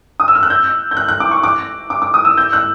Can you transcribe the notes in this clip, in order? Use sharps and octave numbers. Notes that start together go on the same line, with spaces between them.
D#6
E6
F6
F#6
G6
G6
F#6
F#6
D6
C#6
D6
D6
D6
D#6
E6
G6
F#6